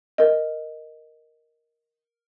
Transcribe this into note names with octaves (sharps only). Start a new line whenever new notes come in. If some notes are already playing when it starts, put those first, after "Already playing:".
A#4 D#5